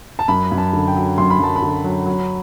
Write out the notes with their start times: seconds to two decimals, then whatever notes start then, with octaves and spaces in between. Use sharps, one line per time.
0.19 A5
0.28 F#2 B5
0.52 F#2
0.58 A5
0.73 D3
0.87 G5
0.96 F#3
1.18 F#2 C6
1.30 B5
1.40 F#2 A5
1.56 B5
1.62 D3
1.84 F#3
2.06 F#3